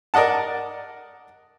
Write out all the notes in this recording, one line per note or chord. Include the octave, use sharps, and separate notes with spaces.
A#4 D5 D#5 F#5 A5